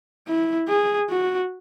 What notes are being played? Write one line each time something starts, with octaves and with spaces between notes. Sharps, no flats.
E4
G#4
F#4